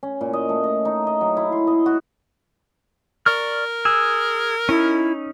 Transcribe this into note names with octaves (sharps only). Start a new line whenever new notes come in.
C#4
A#2
D#5
A3
D#5
D#4
D#5
F#3
E4
C6
D#5
F#4
A#4 D5 C#6 F6
G#4 E6
C#4 D#4 E4